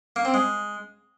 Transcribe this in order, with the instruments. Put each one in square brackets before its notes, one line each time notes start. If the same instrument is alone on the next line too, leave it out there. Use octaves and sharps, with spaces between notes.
[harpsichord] A#3
C4
G#3